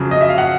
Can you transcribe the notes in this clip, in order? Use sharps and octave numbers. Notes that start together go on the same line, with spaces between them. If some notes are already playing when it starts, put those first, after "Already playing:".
Already playing: F2 C#3 F#3
D#5
E5
F5
F#5